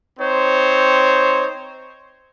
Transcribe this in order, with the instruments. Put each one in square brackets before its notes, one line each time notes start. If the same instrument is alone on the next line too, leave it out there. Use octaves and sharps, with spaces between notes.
[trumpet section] C4 D#4 C5 C#5